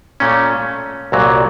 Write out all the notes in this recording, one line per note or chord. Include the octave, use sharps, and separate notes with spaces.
A#2 A3 C#4
C2 A#2 F#3